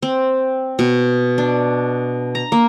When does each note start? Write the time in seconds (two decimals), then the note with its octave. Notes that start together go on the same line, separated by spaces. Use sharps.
0.02 C4
0.79 B2
1.38 D4
2.35 A#5
2.52 A#3